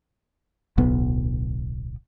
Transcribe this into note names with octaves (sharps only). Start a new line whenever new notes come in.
D1 B1 B3